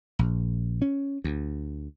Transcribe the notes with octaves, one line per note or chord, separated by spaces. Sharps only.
A#1
C#4
D2